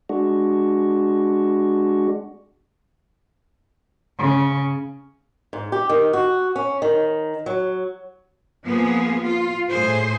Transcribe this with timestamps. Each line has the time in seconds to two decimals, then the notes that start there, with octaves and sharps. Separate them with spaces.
0.09 G#3 D4 F#4
4.20 C#3
5.53 G#2
5.72 G4
5.89 D#3
6.13 F#4
6.56 C#4
6.82 D#3
7.46 F#3
8.66 F3 A#3 B3 G#4
9.25 F4
9.70 A2 G#4 C5